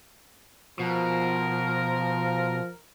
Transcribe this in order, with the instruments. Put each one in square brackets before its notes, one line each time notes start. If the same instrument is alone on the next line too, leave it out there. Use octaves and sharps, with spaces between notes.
[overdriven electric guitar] B2 [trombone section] F3 [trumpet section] A#4